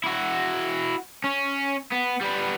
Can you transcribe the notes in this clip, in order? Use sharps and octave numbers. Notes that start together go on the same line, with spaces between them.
E4 F#4
C#4
B3
G3 B3